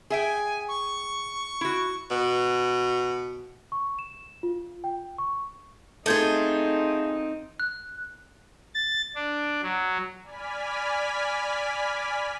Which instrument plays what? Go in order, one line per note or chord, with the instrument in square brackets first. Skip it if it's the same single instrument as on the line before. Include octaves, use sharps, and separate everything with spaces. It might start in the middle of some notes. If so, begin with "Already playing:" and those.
[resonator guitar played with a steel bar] G#4 E5 G5 [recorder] G#5
[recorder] C#6
[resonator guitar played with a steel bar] E4 F#4
[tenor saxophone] B2
[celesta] C#6
E7
F4
G5
C#6
[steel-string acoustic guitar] A3 F4 G#4 [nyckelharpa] C4 D#4 [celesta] A4 G6 G#6
[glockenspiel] F#6
[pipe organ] A6
D4
F#3
[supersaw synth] D5 G#5 B5 F6 B6